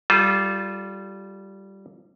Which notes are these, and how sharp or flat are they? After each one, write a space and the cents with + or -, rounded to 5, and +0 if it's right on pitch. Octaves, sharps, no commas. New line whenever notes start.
G3 -10 F4 +0 A4 -35